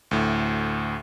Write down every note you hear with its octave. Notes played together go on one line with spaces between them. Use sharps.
D2 A2